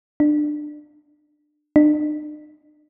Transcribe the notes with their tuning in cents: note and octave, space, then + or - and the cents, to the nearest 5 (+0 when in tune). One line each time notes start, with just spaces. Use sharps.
D4 +25
D4 +45